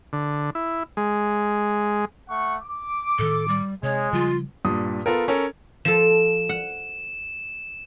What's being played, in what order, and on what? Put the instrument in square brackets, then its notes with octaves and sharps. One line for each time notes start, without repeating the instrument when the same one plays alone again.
[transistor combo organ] D3
E4
G#3
[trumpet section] A3 F#5 C#6
D6
[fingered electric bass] A2 D#3 [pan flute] A4
[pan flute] G3
[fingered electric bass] C3 [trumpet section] G#3 [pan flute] C#5
[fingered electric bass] C#3 F3 G3 [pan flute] F4
[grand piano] G2 A#2 D#6
B3 F4 A4 A#4
C#4 A4 A#4
[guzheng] F3 A4 [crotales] E7
[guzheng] F#5